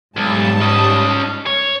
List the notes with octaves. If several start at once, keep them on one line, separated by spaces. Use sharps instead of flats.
B1 G#2 G3 A5
C#4 D#5
C#5